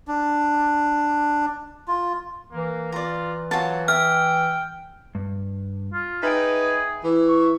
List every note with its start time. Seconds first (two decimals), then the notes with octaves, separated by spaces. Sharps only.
0.08 D4
1.88 F4
2.52 E3 A#3
2.92 F4 D5 A#5
3.51 F#3 F4 F#4 A5
3.88 E5 G5 F6
5.15 G2
5.93 F4
6.23 D#4 G#4 B4 E5 G5
7.03 E3
7.28 C#6